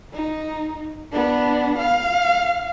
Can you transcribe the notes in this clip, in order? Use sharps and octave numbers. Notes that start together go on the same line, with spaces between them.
D#4
B3 D4
F5